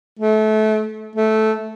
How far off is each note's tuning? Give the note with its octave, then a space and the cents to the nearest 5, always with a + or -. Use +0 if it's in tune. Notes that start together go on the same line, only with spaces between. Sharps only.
A3 -25
A3 -10